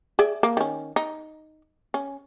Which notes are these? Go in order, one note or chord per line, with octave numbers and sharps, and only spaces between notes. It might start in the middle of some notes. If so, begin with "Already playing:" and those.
G#4 D5 E5
A#3
D#3 C#4
D#4
C#4